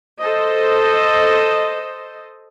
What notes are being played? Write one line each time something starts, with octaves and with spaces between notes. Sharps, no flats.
A4 C5 D#5